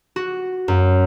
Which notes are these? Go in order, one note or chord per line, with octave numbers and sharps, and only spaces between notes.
F#4
F#2